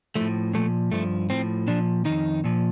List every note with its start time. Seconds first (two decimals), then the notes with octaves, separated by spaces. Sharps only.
0.15 A2 F3 A3
0.53 A#2 F3 A3
0.91 G2 F3 A3
1.30 A2 F3 C4
1.68 A#2 F3 D4
2.05 F2 D#3 D#4
2.44 A#2 F3